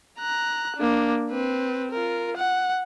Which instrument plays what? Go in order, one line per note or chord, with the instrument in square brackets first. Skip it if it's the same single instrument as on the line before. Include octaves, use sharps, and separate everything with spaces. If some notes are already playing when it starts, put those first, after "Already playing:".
[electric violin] A#5 F#6
A#3 D4
C4 B4
F4 A#4
F#5